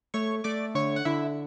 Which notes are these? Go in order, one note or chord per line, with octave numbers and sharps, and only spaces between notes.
A3 C#5 C#6
A3 D5 D6
D3 C#5 C#6
F#5
D3 E4 E5